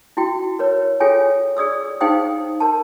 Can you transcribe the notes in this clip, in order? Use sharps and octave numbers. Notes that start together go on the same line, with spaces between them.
E4 F#4 G5
A#4 B4 C#5
F4 G#4 A4 C#5 G5 G#5
G#4 D5 D#6 E6
D#4 G#4 C5 F5 G5 D#6
A#4 A5